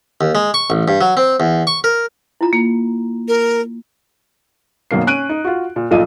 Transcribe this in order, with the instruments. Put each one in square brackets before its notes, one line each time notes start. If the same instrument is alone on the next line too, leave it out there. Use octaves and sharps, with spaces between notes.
[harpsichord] D#2
G#3
C#6
A1
G2
F#3
C4
E2
C#6
A#4
[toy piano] E4 F4 A#5
[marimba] A#3
[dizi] A#4
[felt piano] G#1 F#2 B2 A#3 C7
C#4 F#6 D7 D#7
D#4
F4 F#4
A#2
B1 A#2 F3 F4 D#5 D#7